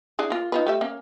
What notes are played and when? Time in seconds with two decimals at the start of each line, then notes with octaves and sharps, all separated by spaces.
0.19 D4 E4 G#4
0.30 A#3 F4
0.52 D#4 F4 B4
0.67 A3 G4 E5
0.81 A#3 C#4